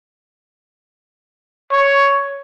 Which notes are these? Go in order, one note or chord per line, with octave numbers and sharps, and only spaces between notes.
C#5